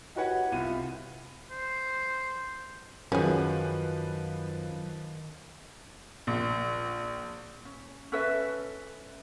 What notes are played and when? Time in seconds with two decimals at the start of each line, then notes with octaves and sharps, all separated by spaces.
0.15 D#4 F#4 G4 B4 C#5 F#5
0.52 C2 F4 D#7
1.51 C5
3.12 F#2 D#3 F3 C#4 G#4 B4
6.27 A#1
7.65 C#4
8.12 C#4 A4 B4 E5